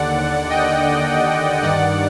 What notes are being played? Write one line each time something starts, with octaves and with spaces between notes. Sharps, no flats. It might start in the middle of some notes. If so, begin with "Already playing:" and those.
Already playing: D#2 D3 D5 F#5
D#5 G5
G2 D#3 D5 F#5